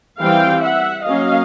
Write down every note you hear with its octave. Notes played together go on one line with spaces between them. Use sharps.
E3 G3 C4 F5 G5
E5 F#5
F#3 A#3 C#4 D#5 F5